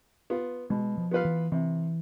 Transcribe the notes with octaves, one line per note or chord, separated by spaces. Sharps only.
B3 F4
B2 G#3
F3
B3 F4 B4 F5
E3
C3 E3